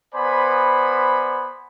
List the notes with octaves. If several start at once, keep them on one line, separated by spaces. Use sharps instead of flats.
B3 C5 D5 G#5 B5